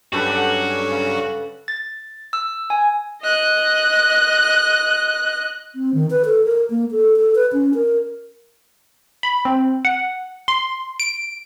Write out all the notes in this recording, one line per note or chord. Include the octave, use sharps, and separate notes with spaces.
G2 F#3 C#4 F#4 G4 A4 B4
D5 F#5
C#3
A6
E6
G#5
D#5 F#6
C4
D#3
B4
A4
A#4
A#3
A4
A4
B4
C#4
A#4
B5
C4
F#5
C6
D7